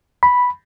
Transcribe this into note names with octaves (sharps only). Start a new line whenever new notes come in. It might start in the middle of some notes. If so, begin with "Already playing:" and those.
B5